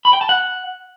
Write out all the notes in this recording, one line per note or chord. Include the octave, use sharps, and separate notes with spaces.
B5
G5
A5
F#5